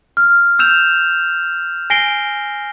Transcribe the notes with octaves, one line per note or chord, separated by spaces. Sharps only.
F6
E6 G6 E7 F7
G#5 A#6 C7 D7 G7